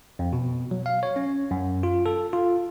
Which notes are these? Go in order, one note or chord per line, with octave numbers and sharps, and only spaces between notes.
F2
B2
F#3
F5
C#5
C#4
F#2
F4
A4
F4